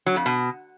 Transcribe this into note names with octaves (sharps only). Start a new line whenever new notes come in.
F#3
F2
B2